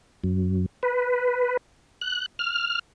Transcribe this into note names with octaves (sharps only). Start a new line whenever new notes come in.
F#2
B4
F#6
F6